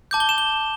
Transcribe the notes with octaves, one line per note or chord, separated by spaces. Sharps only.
A5 D6 G6
G7
E7
G7